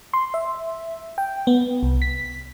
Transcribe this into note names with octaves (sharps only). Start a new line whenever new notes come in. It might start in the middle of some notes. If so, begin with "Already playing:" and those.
C6
E5
G5
B3
C2
B6